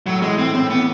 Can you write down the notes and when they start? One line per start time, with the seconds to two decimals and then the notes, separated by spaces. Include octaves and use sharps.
0.06 A2 F#3
0.22 E3 G#3
0.38 A2 C4
0.54 A2 C4
0.70 E3 B3